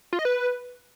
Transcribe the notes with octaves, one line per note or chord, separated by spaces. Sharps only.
F4
D#5
B4